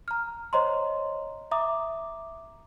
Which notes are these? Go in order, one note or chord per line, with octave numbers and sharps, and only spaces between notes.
A#5 F6
C5 C#5 D#5 A#5 C6
E5 A#5 D6 D#6